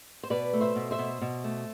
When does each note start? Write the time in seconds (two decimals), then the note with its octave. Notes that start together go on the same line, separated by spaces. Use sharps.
0.23 C5
0.30 B2 B4 D5
0.53 A3
0.61 C5 E5
0.76 B2
0.91 C5 E5
0.99 B2
1.21 B2
1.44 A3